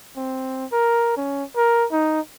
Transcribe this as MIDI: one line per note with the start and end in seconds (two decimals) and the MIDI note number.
0.17 0.65 60
0.72 1.15 70
1.17 1.44 61
1.56 1.86 70
1.92 2.20 63